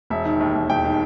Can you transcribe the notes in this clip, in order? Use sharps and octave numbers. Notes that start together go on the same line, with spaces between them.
E1 E5
D#3
D#2
E1
E1 G5
D#3